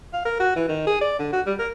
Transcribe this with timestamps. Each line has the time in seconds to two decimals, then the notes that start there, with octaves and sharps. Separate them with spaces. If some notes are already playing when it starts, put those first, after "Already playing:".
0.14 F5
0.25 A#4
0.40 F#4
0.56 E3
0.69 D#3
0.87 G#4
1.01 D5
1.19 D3
1.33 F#4
1.46 G3
1.59 A#4